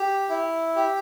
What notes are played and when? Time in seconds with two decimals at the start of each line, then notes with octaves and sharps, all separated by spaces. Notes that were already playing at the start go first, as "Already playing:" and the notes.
Already playing: G4
0.29 E4
0.76 G4